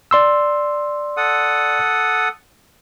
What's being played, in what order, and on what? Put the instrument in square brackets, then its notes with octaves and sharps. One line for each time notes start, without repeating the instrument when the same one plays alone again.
[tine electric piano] D5 C6 E6
[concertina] A4 F#5 D#6